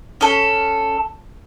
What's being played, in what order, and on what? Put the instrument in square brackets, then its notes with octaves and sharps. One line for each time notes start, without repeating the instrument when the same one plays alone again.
[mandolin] C#4 A4